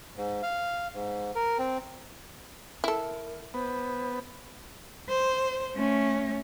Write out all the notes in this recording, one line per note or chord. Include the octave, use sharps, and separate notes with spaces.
G#2
F5
G#2
A#4
C4
E4 A4 A#4
B3 C5
C5
A3 C#4